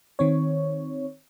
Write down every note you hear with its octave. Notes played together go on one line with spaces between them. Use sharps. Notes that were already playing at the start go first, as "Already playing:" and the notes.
D#3 C4 C#5